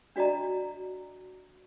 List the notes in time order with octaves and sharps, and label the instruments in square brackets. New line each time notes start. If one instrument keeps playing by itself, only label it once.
[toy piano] D4 F#4 D5 D#5 A#5